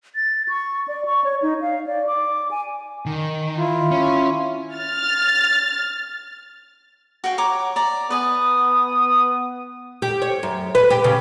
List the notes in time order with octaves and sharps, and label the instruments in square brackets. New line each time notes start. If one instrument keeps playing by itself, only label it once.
[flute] A6
C#6
D5
C#6
C#5
D#4
F5
D5
D6
G#5
[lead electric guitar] D#3
[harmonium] E4 F4
[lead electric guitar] C#4
[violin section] F6 A6
[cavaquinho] F#4 F5 G5
C#5 A#5 D6
D5 A#5
[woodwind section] B3 D#6 [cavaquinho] B4 G#5
[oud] G4
C#5
F#2
B4
G4
C#3